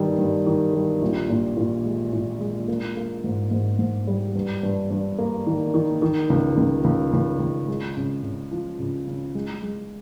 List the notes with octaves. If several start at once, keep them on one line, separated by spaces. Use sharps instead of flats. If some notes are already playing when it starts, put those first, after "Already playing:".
Already playing: G2 D#3 G3
G2
D#3
G3
A#1
A#2
A#2
G#3
A#2
G#3
A#3
A#3
G#2
G#2
G#2
G3
G2
G2
G2
A#3
D#3
D#3
D#3
C#2
C#2
C#2
C#2
C#2
G#3
C#3
C#3
F3
C#3
C#3
G#3
G#3